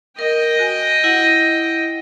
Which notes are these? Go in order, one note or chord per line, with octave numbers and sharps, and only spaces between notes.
A#4 D#5 G5
F#4 G#5
E4 F#5